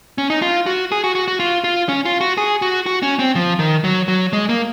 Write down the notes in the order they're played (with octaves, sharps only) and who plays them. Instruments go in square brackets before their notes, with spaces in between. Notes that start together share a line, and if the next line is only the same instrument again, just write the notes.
[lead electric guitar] C#4
D#4
F4
F#4
G#4
F#4
F#4
F#4
F4
F4
C#4
F4
F#4
G#4
F#4
F#4
C#4
C4
F3
D#3
F#3
F#3
G#3
A#3